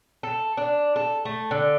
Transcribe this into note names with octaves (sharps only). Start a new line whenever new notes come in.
A4
D4
A4
A3
D3